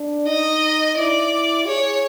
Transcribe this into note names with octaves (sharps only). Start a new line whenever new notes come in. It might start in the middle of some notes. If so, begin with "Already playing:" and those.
Already playing: D4
D#4 D#5
E4 D5
G#4 C#5